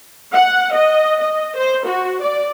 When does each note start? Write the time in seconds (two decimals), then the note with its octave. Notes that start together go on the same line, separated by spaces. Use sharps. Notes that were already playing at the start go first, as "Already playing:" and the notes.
0.32 F#5
0.74 D#5
1.20 D#5
1.56 C5
1.85 F#4
2.22 D5